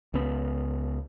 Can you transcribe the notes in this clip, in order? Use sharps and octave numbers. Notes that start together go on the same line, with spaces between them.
C#2 B3